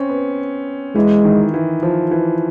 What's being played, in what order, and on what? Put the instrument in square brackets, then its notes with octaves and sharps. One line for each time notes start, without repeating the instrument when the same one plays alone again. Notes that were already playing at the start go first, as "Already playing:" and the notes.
Already playing: [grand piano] C4 C#4
B3
[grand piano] E3 [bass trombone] G#3
[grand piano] D#3
E3
F3
E3